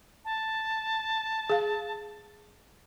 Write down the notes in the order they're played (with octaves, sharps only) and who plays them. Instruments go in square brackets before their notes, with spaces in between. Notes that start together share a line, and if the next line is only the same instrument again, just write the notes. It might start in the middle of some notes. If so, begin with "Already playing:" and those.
[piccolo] A5
[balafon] G#4 F5